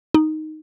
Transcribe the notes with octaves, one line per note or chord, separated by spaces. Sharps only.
D#4